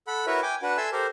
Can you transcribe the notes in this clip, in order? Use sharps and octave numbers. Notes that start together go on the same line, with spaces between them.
A4 F#5 B5
E4 F#4 A#4 B4 C#5 E5
G5 G#5 D6
D4 F#4 B4 F#5
A4 E5 G#5 A5 C6 E6
G4 A4 A#4 C5